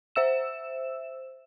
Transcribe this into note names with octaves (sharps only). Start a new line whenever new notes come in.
C5 E5 E6 E7